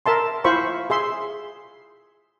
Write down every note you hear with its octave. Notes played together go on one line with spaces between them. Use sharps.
A#4 E5 A5 C6
E4 F4 C5 B5 C#6
G#4 E5 C6